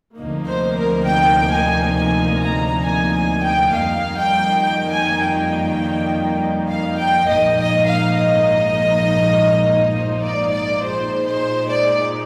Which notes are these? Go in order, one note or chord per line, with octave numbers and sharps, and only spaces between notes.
D2 C3 F3 A#3 D#4
C5
A#4
G5
G#5
G#5
A#5
G#5
G#5
G5
F2 D#3 G3 A#3 D#4 F5
G5
G5
G#5
G5
F5
G5
A#1 G#2 F3 A#3 D#4 D#5
D#5
F5
D#5
C5
D5
D5
A#2 G#3 D#4 C5
C5
D5